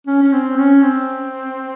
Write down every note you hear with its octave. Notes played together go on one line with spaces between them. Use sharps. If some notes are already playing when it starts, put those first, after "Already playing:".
C#4
C#4
C4
C#4
C4